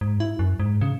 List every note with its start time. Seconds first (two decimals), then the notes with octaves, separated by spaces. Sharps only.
0.01 G#2
0.20 E4
0.39 F#2
0.60 G#2
0.81 C#3